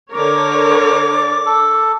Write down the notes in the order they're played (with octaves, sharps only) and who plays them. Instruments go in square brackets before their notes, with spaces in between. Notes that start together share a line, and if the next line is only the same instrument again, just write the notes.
[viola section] D3 A#4 C#5 [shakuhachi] D6
[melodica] D5
A4